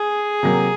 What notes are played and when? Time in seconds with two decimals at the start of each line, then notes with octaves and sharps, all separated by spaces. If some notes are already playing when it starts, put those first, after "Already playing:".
Already playing: G#4
0.43 C3 F#3 A#3